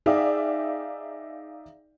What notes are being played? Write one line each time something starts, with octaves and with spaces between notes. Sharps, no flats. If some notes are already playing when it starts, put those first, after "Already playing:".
D#4 G#4 D5 E5 F5 G5